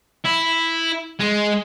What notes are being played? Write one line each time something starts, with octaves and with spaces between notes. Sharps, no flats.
E4
G#3